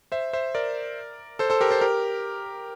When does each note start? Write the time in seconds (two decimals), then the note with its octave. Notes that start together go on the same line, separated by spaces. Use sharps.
0.12 C5 E5
0.33 C5 E5
0.55 A#4 D5
1.39 A4 C5
1.50 A4 C5
1.61 G4 A#4
1.71 A4 C5
1.81 G4 A#4